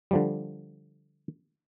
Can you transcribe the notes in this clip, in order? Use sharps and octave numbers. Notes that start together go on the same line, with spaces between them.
D3 F3 G3